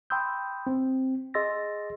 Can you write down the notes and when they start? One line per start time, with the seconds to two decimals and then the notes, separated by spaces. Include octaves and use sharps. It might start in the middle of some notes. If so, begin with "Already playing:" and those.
0.10 G5 B5 C6 D#6 E6 G6
0.67 C4
1.34 G#4 D#5 C6 E6 A6 A#6